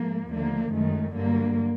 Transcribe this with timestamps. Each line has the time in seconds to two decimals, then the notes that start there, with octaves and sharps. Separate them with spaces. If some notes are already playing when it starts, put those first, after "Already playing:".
Already playing: G#2 F3 A3 A#3
0.30 D#2 D3 F3 A3 A#3
0.72 F#2 D#3 G#3 A3
1.14 G2 D3 F#3 A#3